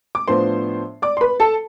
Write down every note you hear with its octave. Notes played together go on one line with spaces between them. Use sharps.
D6
A2 F3 B3 D4 C5 C6
D5 D6
C6
B4 B5
A4 A5